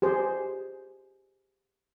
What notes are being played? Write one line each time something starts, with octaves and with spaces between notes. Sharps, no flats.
G4 G#4 C5